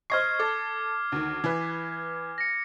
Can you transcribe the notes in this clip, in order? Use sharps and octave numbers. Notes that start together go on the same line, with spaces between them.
C5 D#5 C#6 F6 G#6 C7
A4 D6
D2 D#3
E3 B4
A#6 C#7